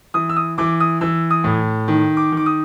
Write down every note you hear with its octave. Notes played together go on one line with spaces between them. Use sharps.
E3 D#6
E6
D#6
E3 D6
D#6
E3 E6
D#6
A2
D#3
D6
D#3
D6
D#6